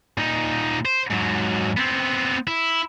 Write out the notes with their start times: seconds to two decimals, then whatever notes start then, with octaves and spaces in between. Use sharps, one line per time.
0.17 A#2 D#4
0.85 C5
1.10 G#2 F#3
1.77 B3 C4
2.47 E4